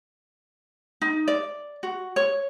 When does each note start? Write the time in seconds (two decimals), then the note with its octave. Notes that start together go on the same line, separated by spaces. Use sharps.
1.01 D#4
1.28 D5
1.83 F#4
2.16 C#5